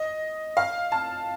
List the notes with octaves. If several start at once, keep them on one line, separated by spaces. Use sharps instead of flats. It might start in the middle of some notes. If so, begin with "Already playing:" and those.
Already playing: D#5
F5
A5